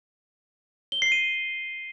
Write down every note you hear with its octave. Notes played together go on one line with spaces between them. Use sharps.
G7
C7
D#7